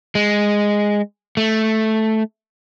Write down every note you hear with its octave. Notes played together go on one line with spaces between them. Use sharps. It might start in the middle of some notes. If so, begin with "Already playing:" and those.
G#3
A3